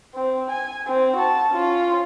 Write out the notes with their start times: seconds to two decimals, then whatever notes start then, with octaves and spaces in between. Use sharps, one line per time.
0.15 C4
0.51 G#5
0.88 C4
1.16 F#4 A5
1.51 C#4 F4